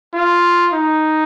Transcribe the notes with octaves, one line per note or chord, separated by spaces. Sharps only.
F4
D#4